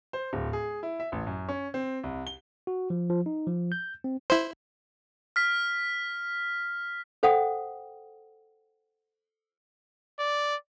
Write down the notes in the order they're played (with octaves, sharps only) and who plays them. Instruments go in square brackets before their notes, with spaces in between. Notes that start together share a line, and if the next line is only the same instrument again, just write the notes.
[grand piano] C5
D1
G#4
E4
E5
A1
F#2
C#4
C4
C2
G7
[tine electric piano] F#4
F3
F3
D#4
F3
G6
C4
[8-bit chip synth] E4 C5
[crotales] F6 B6
[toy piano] A4 C5 F#5 G5 D#6
[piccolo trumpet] D5